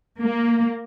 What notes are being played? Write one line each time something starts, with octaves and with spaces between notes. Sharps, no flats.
A#3